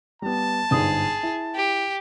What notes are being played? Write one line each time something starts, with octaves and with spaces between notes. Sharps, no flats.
G3 B3 A5
G1 G#2 G#4 D#6
E4
G4